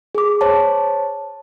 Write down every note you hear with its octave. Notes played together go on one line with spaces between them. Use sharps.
G#4 D6
C5 C#5 A5